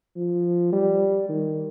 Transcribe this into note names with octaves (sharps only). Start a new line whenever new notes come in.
F3
G3
D#3